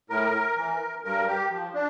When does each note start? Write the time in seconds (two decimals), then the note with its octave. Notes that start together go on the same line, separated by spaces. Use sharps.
0.10 A2 A#4
0.57 E3
1.04 G2 A#4
1.28 G4
1.51 F3
1.74 D4